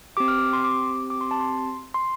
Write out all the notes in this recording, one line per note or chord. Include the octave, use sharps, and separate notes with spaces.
C4 G4 D6
F6
D6
C6
D6
D6
C6
A5
C6
C6